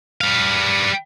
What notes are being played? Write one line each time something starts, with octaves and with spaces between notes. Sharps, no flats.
G3 F5